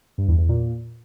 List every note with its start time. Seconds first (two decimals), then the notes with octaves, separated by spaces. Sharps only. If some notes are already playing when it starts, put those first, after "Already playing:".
0.18 G2
0.28 E2
0.39 E2
0.49 A#2